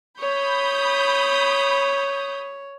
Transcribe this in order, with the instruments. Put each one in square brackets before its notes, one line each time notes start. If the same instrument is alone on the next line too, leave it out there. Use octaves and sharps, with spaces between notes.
[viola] C#5 [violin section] B5 D#6 G6